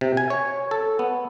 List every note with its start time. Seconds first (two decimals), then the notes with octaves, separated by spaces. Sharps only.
0.01 C3
0.17 G#5
0.30 C#5
0.71 A4
0.99 B3